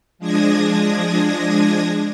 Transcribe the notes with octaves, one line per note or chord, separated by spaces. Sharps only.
F3 G#3 D4 D#6 G#6 A#6